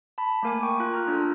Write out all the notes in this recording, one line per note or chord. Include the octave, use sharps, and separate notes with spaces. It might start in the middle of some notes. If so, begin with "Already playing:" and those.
A5 B5
A3 A#3 A#4 G#5 D6
G5 C#6
F4 F#6
A#5 F6
D4 F4 A4